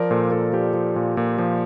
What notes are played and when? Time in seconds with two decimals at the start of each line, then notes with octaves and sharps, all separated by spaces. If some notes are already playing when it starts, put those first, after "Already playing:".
Already playing: F3 A#4 D5
0.10 A#2 A4 C5
0.31 A#2 A4
0.53 F3 G4
0.74 F3
0.96 A#2
1.17 A#2
1.38 F3